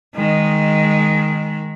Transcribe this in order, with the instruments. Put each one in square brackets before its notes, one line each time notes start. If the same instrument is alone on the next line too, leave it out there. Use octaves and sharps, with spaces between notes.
[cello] D#3 G#3